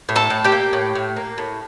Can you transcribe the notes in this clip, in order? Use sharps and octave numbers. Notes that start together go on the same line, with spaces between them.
A2
A4 A5
A2
G4 G5
A#3
A2
A2
A#3
A2